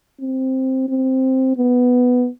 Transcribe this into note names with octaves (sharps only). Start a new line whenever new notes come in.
C4
C4
B3